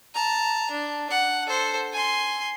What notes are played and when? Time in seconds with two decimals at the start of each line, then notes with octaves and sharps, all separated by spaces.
0.15 A5 A#5
0.71 D4
1.11 F#5
1.46 A4 C5
1.93 G#5 C6